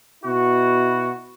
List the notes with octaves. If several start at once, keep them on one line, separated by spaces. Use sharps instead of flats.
B2 E4 F#4